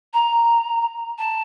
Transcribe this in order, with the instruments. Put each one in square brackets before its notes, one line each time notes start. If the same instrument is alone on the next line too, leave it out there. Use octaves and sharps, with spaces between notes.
[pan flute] A#5
A5